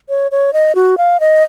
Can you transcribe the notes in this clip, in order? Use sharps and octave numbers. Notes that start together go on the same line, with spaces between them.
C#5
C#5
D#5
F#4
F5
D#5